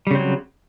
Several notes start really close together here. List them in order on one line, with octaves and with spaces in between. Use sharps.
G3 C#3 C4 F#3